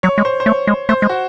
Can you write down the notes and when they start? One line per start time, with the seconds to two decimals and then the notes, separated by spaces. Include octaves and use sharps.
0.03 F#3 C#5
0.18 G#3
0.25 C5
0.40 C5
0.46 A3 C#5
0.67 G#3
0.89 A3 C5
1.02 G#3
1.09 F#4